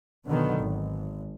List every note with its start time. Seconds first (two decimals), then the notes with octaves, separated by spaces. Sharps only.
0.27 B2 D3 D#3 F#3 B3
0.58 G#1